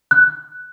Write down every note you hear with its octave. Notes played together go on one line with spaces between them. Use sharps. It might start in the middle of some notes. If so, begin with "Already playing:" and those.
F#6